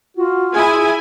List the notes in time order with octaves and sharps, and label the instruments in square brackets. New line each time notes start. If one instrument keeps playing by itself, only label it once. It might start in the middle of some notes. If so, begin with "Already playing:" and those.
[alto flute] F4 [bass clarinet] F#4
[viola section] E4 G#5 [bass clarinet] G#4